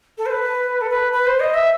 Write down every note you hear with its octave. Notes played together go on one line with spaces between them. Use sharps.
A4
C5
B4
A4
B4
B4
C5
D#5
E5